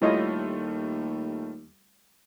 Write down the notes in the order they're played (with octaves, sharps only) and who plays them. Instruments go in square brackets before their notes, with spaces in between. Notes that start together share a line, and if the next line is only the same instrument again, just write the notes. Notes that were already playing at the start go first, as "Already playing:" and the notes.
[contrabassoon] D#2 [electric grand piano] G3 A3 F4 [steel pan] E4 C#5 D#5